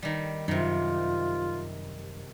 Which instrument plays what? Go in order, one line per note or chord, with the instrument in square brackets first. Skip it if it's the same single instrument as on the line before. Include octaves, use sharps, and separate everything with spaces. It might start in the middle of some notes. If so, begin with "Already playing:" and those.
[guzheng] D#3 G3
[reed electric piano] F#2 [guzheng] C3 D#3 [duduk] F4